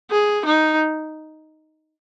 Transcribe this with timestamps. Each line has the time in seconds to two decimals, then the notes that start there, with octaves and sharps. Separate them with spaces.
0.11 G#4
0.46 D#4